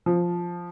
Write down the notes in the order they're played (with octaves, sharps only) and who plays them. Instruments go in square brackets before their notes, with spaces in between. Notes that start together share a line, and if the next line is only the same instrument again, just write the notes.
[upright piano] F3